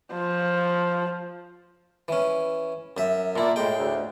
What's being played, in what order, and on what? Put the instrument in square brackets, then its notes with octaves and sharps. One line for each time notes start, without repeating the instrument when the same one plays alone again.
[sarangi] F3
[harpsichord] E3 C#4
F#2 E5
[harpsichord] A#2 E4 [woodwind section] A4 A#4 D5
[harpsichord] A2 G5 [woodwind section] G#3
[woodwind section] D2